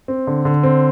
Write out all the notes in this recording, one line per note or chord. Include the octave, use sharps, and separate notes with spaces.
C4
D3
D3
C4